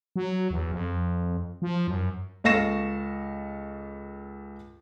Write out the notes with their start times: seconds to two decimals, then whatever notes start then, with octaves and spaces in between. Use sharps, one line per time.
0.16 F#3
0.51 E2
0.72 F2
1.62 F3
1.87 F#2
2.44 C#2 A4 F5 C#6 A#6 E7